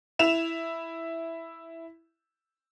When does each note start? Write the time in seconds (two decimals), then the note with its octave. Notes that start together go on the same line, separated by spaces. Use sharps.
0.19 E4 E7 F7